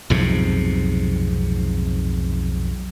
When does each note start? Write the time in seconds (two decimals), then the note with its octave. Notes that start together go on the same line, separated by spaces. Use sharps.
0.10 B1 F2 G#2 C3